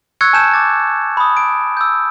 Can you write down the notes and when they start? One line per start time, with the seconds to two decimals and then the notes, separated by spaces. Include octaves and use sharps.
0.21 C#6 E6 F#6 G#6 C#7
0.33 G#5 A5 G6 E7
0.53 D6 A6
1.17 B5 D#6
1.37 D7
1.77 E6 G6